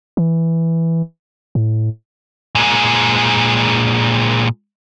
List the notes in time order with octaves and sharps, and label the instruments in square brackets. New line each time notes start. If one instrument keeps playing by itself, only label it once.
[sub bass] E3
A2
[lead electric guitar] A#2 G#3